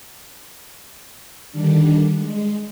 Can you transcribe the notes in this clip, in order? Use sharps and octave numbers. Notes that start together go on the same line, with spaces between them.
D3 D#3 G3 D4
G#3